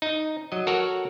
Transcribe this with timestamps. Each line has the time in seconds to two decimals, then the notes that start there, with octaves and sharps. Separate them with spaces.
0.02 D#4
0.52 F#3 D#5
0.67 F#4 A4 A#4 C#5 F#5